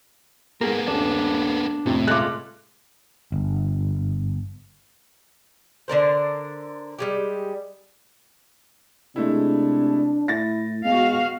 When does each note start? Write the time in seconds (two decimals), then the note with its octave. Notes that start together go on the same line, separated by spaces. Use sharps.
0.61 G#2 A#3 B3 G#4 A#4
0.88 D#1 G2 D4
1.86 F2 A2 C3
2.08 G#3 A3 F4 D6 F#6
3.32 G1
5.88 D3 D4 A#4 C5
6.99 G3 G#3 G4
9.16 C3 G#3 A3 D4 E4
10.28 A2 E4 A6 A#6
10.85 G#3 B3 F#4 F5